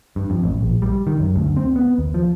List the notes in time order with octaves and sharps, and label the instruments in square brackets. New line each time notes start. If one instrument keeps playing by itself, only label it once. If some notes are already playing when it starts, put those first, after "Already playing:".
[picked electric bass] G2
F2
A1
A#1
G3
D#3
F#2
D2
C4
B3
D#2
F3